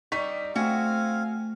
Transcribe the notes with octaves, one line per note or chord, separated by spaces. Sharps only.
G3 D#4 C#6 B6
A3 C4 F#4 F5 G#5